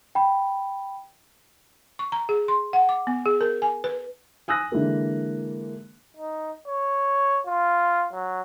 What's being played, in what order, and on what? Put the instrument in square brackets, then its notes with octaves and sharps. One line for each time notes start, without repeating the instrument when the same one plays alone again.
[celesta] G5 B5
[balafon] C#6
A#5
G#4
C6
F#5
D6
B3
G#4
A#4
G#5
B4
[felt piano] G#5 D#6 E6 F#6 A#6
D3 E3 G#3 A#3
[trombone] D#4
C#5
F4
F#3